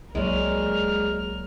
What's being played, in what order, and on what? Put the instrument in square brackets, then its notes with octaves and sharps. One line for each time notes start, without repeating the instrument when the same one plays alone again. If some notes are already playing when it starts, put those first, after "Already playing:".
[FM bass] C2 [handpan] F#3 A#3 C#5 [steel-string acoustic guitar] G#3 D4 [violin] A#4 F6